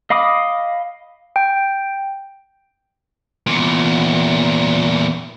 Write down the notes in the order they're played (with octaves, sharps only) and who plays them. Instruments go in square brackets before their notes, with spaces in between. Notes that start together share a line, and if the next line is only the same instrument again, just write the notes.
[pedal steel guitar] D#5 F5 B5 D6 D#6
[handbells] G5
[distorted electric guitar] E2 A#2